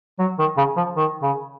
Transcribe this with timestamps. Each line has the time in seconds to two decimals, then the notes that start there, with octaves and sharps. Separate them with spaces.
0.19 F#3
0.39 D#3
0.57 C#3
0.77 F3
0.97 D#3
1.23 C#3